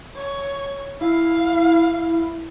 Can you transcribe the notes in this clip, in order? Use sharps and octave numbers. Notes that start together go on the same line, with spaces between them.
C#5
E4 F5